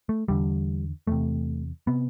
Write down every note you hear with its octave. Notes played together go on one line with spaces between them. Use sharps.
A3
E2 D3 G3
E2 C3 A3
C3 B3